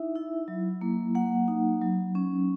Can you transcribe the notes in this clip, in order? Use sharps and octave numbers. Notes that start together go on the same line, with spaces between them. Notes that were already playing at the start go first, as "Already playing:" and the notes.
Already playing: D#4 E4 E5
E4
F#3
A#3
A#3 F#5
D#4
F#3
C#4